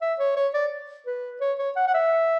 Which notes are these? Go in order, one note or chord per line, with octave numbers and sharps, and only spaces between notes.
E5
C#5
C#5
D5
B4
C#5
C#5
F#5
F#5
E5